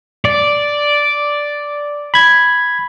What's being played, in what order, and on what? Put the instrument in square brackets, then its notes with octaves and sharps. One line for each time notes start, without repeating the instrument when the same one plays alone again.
[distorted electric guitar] D5
[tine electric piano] B5 G#6